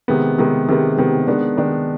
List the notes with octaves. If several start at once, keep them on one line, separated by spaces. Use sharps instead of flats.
C3 D#3 G#3 B3
C3 D#3 G#3 B3
C3 D#3 G#3 B3
C3 D#3 G#3 B3
D#3 G#3 B3 D4
D#3 G#3 B3 D4